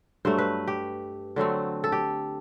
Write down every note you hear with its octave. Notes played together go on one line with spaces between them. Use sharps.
G2 F#3 A3 C5
B4
G4
D3 F#3 A3 C4
A4
G4